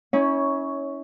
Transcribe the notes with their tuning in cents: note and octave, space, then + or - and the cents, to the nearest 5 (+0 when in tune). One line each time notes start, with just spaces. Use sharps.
C#4 +0 E4 -35 C#5 +10